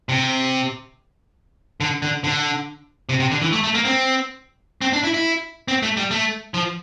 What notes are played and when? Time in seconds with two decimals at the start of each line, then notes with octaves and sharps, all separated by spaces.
0.09 C3
1.81 D3
2.02 D3
2.24 D3
3.09 C3
3.20 C3
3.31 D3
3.42 E3
3.53 A3
3.64 A3
3.75 A#3
3.85 C4
4.82 C4
4.93 D4
5.04 E4
5.14 E4
5.68 C4
5.83 A3
5.97 G3
6.11 A3
6.54 F3